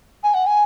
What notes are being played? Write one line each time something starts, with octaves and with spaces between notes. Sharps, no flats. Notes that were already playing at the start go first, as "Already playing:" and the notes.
G#5
F#5
G#5